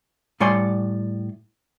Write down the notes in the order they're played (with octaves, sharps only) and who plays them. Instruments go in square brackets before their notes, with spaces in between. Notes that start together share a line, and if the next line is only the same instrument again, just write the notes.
[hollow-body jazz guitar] A2 G3 C#5 D5 G#5 C6